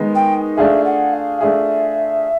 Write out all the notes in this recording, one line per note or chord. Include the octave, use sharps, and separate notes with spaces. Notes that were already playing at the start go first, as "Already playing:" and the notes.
Already playing: D#3 G#3 B3 D#4
G5
A3 D4 F4 G#4 E5
F#5
F5
A3 D4 F4 G#4 E5